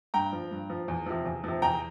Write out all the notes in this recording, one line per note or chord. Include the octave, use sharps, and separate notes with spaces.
G2 G5 A#5
F3
G2
F3
E2
C3 F3
E2
C3 F3
E2 G5 A#5